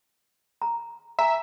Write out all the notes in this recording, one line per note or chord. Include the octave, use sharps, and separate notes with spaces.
A#5
E5 G#5 A#5